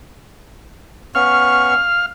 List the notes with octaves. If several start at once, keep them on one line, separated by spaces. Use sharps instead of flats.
B3 C#4 F5 C#6 F6